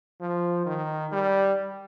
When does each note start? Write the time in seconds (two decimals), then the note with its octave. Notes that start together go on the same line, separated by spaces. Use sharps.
0.21 F3
0.66 D#3
1.12 G3